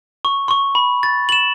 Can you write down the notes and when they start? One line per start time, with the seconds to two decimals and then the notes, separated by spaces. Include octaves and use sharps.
0.25 C#6
0.48 C6 C#6
0.75 B5
1.03 A6
1.29 E7 F#7